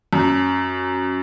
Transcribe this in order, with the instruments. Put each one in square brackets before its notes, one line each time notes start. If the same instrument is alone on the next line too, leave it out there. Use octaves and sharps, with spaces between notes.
[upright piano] F#2